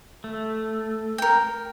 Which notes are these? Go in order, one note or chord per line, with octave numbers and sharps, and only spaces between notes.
A3
A#4 G5